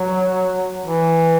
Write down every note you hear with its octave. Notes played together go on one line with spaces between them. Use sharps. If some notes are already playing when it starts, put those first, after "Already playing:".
Already playing: F#3
E3